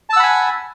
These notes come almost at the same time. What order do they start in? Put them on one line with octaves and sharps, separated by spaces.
A5 E6 F#5 B5 G#5